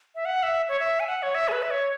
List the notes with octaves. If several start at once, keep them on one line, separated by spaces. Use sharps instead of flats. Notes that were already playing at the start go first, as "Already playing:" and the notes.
E5
F#5
E5
C#5
E5
G#5
F#5
C#5
E5
G#4
B4
E5
C#5